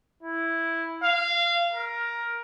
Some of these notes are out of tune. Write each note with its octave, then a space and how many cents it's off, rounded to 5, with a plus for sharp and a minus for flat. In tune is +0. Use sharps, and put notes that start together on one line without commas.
E4 +0
F5 -20
A#4 +10